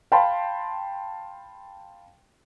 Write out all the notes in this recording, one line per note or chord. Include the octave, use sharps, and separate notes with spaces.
F5 G5 A5 B5 C6